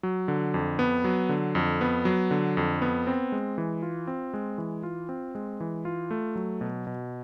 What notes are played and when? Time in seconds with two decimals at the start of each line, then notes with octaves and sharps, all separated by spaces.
0.03 F#3
0.28 D3
0.54 F2
0.79 B3
1.04 F#3
1.29 D3
1.55 F2
1.81 B3
2.05 F#3
2.31 D3
2.57 F2
2.82 B3
3.07 C4
3.32 G#3
3.58 E3
3.82 F4
4.07 C4
4.34 G#3
4.58 E3
4.83 F4
5.09 C4
5.35 G#3
5.60 E3
5.85 F4
6.11 A3
6.36 F#3
6.61 B2
6.87 B2